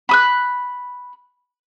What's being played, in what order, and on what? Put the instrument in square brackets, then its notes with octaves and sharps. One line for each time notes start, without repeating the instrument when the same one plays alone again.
[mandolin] B5 D#6 F#6